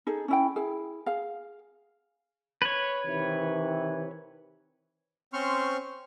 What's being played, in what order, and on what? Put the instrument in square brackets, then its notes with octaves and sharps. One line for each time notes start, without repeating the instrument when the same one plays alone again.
[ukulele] D#4 G#4 A4
C#4 E4 G5
E4 G#4
G#4 F5
[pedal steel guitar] B4 C#5
[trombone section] C3 D#3 E3
[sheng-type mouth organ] C4 C#4 C5 C6 C#6 F6